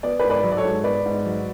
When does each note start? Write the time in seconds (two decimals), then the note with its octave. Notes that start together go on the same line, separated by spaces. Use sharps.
0.03 B3 D5
0.19 B4 D5
0.24 G#2
0.30 B4 D5
0.43 F#3
0.52 D5
0.57 A4 C#5
0.65 G#2
0.84 B3 B4 D5
1.06 G#2
1.26 F#3